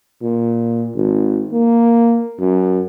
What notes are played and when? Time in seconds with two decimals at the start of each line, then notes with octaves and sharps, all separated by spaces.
0.22 A#2
0.95 G#1
1.53 A#3
2.39 F#2